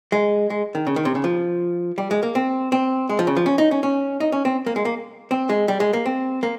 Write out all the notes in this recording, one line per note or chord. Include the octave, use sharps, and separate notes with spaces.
G#3
G#3
D#3
C#3
D#3
C3
C#3
F3
G3
G#3
A#3
C4
C4
G#3
F3
C#3
F3
C#4
D#4
C#4
C#4
D#4
C#4
C4
A#3
G#3
A#3
C4
G#3
G3
G#3
A#3
C4
A#3